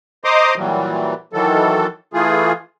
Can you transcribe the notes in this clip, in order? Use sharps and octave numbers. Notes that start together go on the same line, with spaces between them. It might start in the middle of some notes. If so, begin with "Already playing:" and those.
C5 D#5 A#5 C6 D6 D#6
A#2 E3 F#3 G3
D#3 E3 F#3 A4
E3 A3 F4 G#4